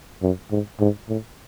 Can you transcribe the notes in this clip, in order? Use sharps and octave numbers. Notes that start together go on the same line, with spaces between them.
F#2
G#2
G#2
A2